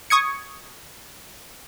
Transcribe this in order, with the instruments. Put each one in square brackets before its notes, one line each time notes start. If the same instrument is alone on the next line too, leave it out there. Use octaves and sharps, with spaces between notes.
[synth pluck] C#6 D#6 G#6 C#7